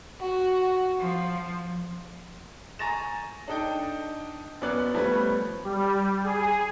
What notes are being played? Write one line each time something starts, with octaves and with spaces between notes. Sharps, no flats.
F#4
F3
G#5 A#5 C#6 A6 A#6 E7
D4 D#4 A4 D#5 G5
F#2 B3 C#4 D5 F#6
F3 G3 A3 B3 B4 C#5
G3
G#4